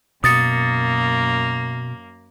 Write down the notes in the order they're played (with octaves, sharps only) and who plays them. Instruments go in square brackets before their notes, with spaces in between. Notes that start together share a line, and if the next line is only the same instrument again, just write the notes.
[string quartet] F#2 A#3 [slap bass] B2 [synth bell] D#6 A6 C#7